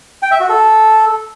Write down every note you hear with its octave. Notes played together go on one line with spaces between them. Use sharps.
G5
E5
F#4
A4